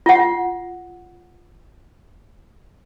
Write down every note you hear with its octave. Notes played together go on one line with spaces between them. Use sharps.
F4 F#5